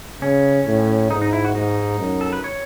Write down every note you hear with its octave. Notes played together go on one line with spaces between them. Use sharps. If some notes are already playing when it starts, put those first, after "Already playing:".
C#3 C#4
A2
G#2 D#4
D#4
E4
F#4
G#2 D#4
F#2
A4
B4
C#5